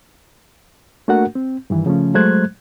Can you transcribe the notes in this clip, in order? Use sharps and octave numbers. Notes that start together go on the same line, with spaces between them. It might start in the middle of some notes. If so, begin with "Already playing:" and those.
A3 A#3 D4 F#4 A#4 F#5
C4
G2 D#3 E3
C#3 F3 A3 C#4
F#3 G#3 A3 C5 F#6 G#6